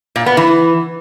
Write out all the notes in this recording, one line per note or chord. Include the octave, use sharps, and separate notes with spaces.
A#2
B3
E3